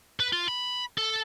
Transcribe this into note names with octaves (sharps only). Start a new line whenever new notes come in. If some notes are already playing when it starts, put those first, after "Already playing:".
B4
F4
B5
A4